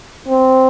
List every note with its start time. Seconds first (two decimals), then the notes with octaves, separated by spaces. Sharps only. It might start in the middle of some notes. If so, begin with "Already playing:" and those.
0.27 C4